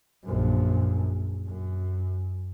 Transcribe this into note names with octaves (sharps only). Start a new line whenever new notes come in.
A#1 F#2
F#2